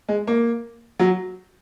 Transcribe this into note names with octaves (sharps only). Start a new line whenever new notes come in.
G#3
A#3
F#3